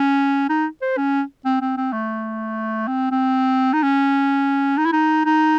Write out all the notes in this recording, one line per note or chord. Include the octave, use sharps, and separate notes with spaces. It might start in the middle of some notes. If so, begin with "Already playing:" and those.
Already playing: C#4
D#4
C5
C#4
C4
C4
C4
A3
C4
C4
D#4
C#4
D#4
E4
D#4
D#4